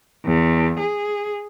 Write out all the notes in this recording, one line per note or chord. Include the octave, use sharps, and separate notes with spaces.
E2
G#4